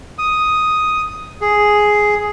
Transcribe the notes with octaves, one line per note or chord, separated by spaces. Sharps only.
D#6
G#4